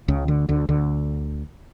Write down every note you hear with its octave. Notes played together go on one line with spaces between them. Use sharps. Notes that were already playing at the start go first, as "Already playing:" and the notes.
C#2 C#3
D2 D3
D2 D3
D2 D3